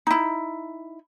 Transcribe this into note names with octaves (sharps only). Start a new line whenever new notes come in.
D#4 E4